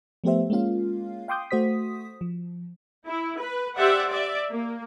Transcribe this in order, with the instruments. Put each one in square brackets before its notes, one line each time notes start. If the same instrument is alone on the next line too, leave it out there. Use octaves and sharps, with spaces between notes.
[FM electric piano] F3 A3 B3 G4 C5 E5
G#3 A#3 C#4 F4 F5
F5 G5 C6 D6 D#6 G6
A3 F#4 C5 D#6 B6
F3
[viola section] E4
B4
G4 C5 D5 E5 F#5
D5 E5
A#3